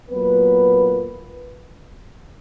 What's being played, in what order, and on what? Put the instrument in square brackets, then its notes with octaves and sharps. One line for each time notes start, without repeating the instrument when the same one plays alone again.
[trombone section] A#2 F#3 A#3 B3 B4